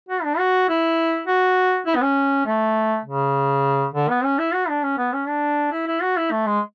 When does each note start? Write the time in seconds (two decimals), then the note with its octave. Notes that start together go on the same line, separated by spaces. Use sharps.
0.09 F#4
0.24 D4
0.38 F#4
0.69 E4
1.27 F#4
1.87 E4
1.96 B3
2.01 C#4
2.46 A3
3.05 C#3
3.94 D3
4.09 B3
4.24 C#4
4.39 E4
4.54 F#4
4.69 D4
4.83 C#4
4.98 B3
5.13 C#4
5.28 D4
5.72 E4
5.87 E4
6.02 F#4
6.17 E4
6.31 A3
6.47 G#3